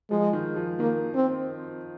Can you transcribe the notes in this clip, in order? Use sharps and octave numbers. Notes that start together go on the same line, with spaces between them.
F3 G#3
D#3
F3
D#3 A#3
C4